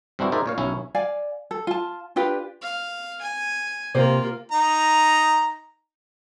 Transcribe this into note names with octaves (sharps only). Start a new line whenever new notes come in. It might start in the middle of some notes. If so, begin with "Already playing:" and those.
G2 C4 D4 E4 F#4
D#4 G#4 A#4 C5 D5 E5
A#2 C#5 F5
B1 C#4 E4 C#5
D5 F5 G#5
A4
F4 A5
D4 F4 G4 B4
F5
G#5
C3 A#3 F4 G4 C5
D#4 A#5